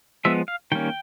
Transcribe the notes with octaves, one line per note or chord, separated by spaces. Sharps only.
F3 G#3 B3 E5
F5
D#3 G3 A#3 C#4 G5